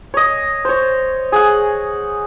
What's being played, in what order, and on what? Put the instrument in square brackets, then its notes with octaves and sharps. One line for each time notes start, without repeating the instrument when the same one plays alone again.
[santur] C#5 D#5
C5 C#5
G#4 F#5